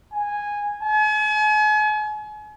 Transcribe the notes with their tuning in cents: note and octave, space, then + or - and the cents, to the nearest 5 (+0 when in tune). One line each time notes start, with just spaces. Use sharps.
G#5 -10
G#5 +40